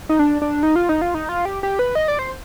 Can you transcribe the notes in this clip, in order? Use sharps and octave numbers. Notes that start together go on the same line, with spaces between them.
D#4
D4
D4
D#4
F4
D#4
F4
D#4
F4
G4
G4
B4
D#5
D5
C5